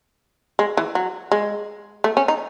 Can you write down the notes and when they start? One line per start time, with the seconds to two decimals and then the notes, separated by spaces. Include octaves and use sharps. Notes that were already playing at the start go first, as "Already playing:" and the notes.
0.59 G#3
0.77 E3
0.95 F#3
1.32 G#3
2.04 A3
2.17 C#4
2.28 D#4